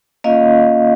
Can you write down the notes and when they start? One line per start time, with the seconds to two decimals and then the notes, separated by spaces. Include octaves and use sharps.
0.24 A#3 C#4 F4 D#5 F5